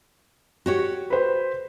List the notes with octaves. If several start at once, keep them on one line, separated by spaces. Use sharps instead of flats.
F#4 G4 C#5
B4 C5